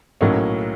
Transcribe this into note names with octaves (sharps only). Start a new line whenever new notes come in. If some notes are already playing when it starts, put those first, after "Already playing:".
B1 A2 F#3 A#3 C#4